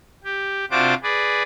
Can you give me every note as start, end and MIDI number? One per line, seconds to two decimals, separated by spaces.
0.24 0.65 67
0.71 0.94 48
0.71 0.94 62
0.71 0.94 65
0.71 0.94 66
0.71 0.94 72
0.71 0.94 86
1.03 1.43 68
1.03 1.43 71
1.03 1.43 74